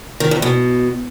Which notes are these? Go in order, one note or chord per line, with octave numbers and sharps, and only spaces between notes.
D#3
E2
B2